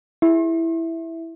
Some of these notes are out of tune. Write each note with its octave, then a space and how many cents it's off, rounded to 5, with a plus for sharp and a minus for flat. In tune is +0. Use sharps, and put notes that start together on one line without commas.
E4 +0 E5 +0